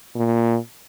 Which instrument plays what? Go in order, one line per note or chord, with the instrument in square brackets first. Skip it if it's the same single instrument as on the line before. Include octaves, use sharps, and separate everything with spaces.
[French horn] A#2